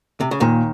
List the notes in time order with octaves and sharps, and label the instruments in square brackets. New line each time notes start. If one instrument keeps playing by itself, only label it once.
[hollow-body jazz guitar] C3
C#3
[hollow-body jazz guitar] D#2 D#3 [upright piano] A#2